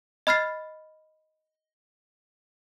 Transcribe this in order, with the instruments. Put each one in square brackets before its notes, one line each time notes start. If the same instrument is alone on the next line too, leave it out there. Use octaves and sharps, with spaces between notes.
[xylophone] D#5 B5 F6 A6 C7